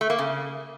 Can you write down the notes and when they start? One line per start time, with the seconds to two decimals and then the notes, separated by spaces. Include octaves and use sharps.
0.01 A3
0.10 A#3
0.19 C#3